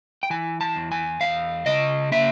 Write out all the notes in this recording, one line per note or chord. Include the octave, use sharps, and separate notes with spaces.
G5
E3 G#5
A5
E2
G#5
E2 F5
C#3 D#5
A#3 E5